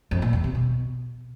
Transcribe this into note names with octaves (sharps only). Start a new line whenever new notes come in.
F2
A#2
E2
C3
B2